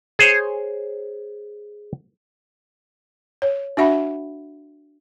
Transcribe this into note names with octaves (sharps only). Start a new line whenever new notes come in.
G#4 C5 C#5
C#5
D4 F#4 E5 F#5 B5